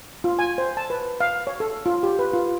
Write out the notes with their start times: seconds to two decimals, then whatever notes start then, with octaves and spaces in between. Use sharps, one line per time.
0.24 F4
0.39 G#5
0.58 C5
0.77 A5
0.90 B4
1.21 F5
1.47 C#5
1.60 A4
1.86 F4
2.03 G4
2.19 B4
2.33 F4